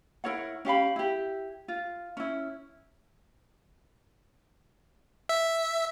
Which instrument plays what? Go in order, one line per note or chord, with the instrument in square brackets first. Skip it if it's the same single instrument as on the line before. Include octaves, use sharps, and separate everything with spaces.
[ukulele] E4 A#4 C#5 F#5
C#4 G4 F5 B5
E4 G4
F4
C#4 E4
[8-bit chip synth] E5